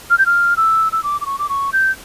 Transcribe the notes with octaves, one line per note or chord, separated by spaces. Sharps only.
F6
G6
F6
E6
E6
D6
D6
C#6
D6
C#6
G6